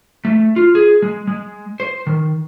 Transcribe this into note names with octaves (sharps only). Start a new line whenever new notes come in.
A3
F4
G#4
G#3
G#3
C5
D#3